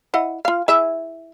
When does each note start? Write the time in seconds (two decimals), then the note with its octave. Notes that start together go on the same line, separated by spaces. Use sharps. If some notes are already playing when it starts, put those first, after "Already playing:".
0.14 E4 D#5 F#5
0.45 F4 F5
0.68 E4 G#4 E5